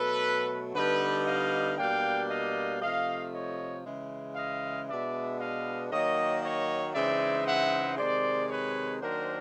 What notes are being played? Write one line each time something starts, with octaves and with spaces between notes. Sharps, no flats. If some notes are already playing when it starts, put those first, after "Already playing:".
Already playing: B2 F#3 A3 A4 B4
D3 G3 B3 D#4 A4 B4
D#5 F5
B2 G3 A#3 D4 F5 G5
D#5 F5
C3 F3 A3 D#5 F5
C#5 D#5
C#3 E3 G#3
D#5 F5
B2 G#3 B3 D4 D5 E5
D#5 F5
D#3 F#3 A#3 C#5 D#5
C#5 D#5
C#3 E3 G#3 C4 D#4 D5 E5
E5 F#5
C3 D#3 G#3 C5 D5
B4 C#5
D#3 F#3 A#3 D4 A#4 C5